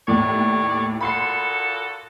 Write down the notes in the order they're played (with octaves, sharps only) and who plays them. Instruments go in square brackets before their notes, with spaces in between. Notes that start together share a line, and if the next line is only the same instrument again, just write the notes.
[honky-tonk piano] D#2 A2 [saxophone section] C#5 D5
[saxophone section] A#2 F#4 A4 [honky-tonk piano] B5 C6 C7